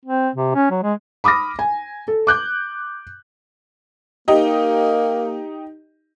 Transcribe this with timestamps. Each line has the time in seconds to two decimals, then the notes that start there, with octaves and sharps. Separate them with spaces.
0.05 C4
0.35 C3
0.55 C#4
0.71 F#3
0.83 G#3
1.24 B5 D6 D#6 F6 A#6
1.59 G#5
2.08 A4
2.27 D6 F#6 G6
4.28 A#3 D#4 G4 D#5